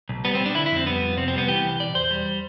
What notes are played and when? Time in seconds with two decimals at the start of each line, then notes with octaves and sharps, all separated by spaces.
0.09 B1
0.25 G3 B3
0.35 C4
0.40 B1
0.46 D4
0.55 D3 E4
0.66 E4
0.71 F2 C4
0.86 G3 B3
1.02 F2
1.17 C3 C4
1.28 C4
1.33 G3 B3
1.48 E3 G4
1.64 C2
1.79 B2 D5
1.95 E2 C5
2.11 G3